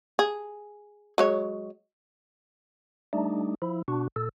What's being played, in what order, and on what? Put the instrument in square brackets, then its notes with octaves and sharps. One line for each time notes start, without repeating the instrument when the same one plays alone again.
[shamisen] G#4
F#3 G#3 C#5
[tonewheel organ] G3 A3 D4 D#4
F3 E4
B2 D4 F#4
A#2 A4